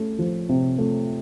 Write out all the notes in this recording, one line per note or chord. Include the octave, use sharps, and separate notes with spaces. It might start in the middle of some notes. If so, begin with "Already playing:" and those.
Already playing: A3 C#4
F3
C3
A3